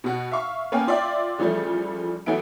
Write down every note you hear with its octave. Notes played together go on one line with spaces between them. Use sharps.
B2 F#4
E5 F5 C#6
A#3 B3 C#4 F5 G5 G#5
F4 D5 E5 G5
C#3 E3 F3 G3 A3
E3 F#3 A3 B3 E5 D7